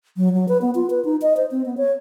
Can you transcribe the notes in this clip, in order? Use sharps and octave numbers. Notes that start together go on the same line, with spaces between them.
F#3
F#3
B4
B3
F4
B4
D#4
D#5
C5
C4
B3
C#5